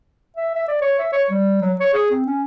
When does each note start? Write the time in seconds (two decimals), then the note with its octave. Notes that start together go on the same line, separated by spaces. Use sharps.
0.37 E5
0.55 E5
0.68 D5
0.81 C#5
0.99 E5
1.12 C#5
1.30 G3
1.61 F#3
1.80 C#5
1.94 G#4
2.11 C4
2.26 C#4